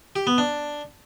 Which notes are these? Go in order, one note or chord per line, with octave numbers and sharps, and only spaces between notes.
G4
B3
D4